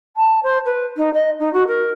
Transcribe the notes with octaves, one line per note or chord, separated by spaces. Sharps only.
A5
C5
B4
D#4
D#5
D#4
F#4
A#4